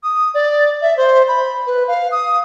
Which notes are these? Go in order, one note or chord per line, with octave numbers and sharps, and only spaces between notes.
D#6
D5
E5
C5
B5
B4
F5
D#6